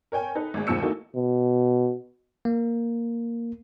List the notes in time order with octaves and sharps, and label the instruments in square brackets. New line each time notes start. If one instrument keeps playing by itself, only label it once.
[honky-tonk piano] A#4 C#5 G5 G#5
D#4 A4 B4
G#1 G#3
D#2 F3 G#3 E6 C#7
E3 A3 A#3 D#4 F#4
[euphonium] B2
[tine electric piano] A#3